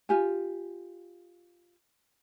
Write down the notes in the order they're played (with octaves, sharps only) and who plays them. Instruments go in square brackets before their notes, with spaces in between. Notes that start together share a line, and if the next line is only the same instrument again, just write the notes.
[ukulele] F4 G4 G#5